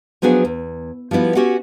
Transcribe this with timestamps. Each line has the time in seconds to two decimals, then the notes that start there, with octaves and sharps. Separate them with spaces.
0.22 F3 F#3 B3 D4 F#4 G#4
0.45 E2
1.11 F3 G3 B3 E4 F#4
1.36 C#4 F#4 G4 E5 F#5